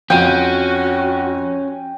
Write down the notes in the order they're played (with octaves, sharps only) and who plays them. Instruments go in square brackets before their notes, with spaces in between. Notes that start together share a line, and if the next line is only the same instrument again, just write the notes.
[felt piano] F2 F4 D#7 [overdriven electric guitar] C#4 [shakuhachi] F#4 [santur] G5